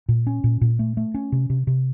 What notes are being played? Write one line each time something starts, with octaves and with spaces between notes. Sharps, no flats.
A#2
C#4
A#2
A#2
A3
A3
C#4
C3
C3
C3